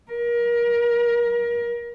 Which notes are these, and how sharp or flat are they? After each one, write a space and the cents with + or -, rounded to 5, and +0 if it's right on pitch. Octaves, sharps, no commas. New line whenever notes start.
A#4 +30